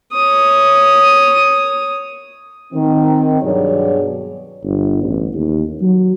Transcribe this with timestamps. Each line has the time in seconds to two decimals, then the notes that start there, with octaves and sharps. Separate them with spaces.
0.13 C#5 D#6
2.73 D#3 C4
3.42 G2 B2 F#3 G#4 C#5 D5
4.64 G1
5.03 A1
5.34 D#2
5.81 F#3